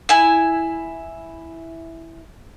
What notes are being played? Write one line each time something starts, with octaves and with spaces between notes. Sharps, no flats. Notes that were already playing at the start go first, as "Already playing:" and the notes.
E4 G#5